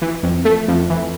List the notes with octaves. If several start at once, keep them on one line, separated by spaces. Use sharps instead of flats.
E3
F2
A3
F2
E3